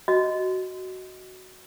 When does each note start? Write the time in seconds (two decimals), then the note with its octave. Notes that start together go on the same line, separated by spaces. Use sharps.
0.08 F#4 D#5